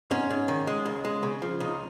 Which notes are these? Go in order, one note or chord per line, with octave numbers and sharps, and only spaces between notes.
G#2 C#4
G#2
D#3
G#3
C#2
G#3
C#3
F3
C#2 D#4